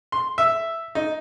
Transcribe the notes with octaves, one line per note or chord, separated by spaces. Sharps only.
C6
E5
D#4